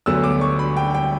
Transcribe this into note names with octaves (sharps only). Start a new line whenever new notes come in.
D2 D3 F#3 B3 E6
D6
C#6
B5
G5
G5